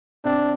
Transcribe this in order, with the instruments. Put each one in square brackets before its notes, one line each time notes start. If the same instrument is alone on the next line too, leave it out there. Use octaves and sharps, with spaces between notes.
[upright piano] C3 C4 [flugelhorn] D4